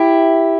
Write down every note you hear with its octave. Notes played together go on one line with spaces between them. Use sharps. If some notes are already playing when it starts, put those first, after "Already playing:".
Already playing: E4 G4